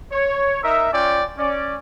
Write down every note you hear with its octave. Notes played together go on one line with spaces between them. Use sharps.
C#5
D#4 A#4 E5
C#4 F4 D5 G5
C#4 D5